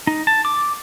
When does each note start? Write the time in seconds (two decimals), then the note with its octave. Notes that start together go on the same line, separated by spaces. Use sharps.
0.07 D#4
0.27 A5
0.45 D6